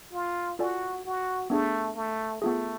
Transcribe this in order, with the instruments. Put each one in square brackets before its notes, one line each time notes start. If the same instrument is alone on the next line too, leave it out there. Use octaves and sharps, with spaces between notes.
[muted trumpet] F4
[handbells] F4 A4 D5 G#5 [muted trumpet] F#4
[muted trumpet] F#4
[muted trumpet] A3 [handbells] B3 D4 G#4
[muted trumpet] A3
[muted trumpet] A3 [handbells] B3 F4 G#4